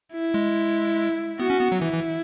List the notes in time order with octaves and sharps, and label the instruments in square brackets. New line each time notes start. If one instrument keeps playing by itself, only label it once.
[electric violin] E4
[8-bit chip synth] G#3
[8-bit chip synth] B3 [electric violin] F#4
[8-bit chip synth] C#4
B3
F#3
[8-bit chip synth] E3 [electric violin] E4
[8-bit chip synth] E3